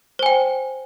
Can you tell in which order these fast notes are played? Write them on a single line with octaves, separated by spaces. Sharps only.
C5 G#5 G5